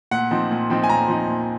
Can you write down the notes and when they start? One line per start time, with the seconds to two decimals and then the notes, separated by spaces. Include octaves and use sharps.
0.11 A#2 F#5
0.31 F3 C4 D#4
0.51 A#2
0.70 F3 C4 D#4
0.84 G#5
0.89 A#2 A#5
1.08 F3 C4 D#4
1.28 A#2